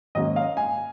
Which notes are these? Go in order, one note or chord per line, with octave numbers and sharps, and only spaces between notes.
G#2 D#3 F#3 A#3 C#4 D#5
F5
G#5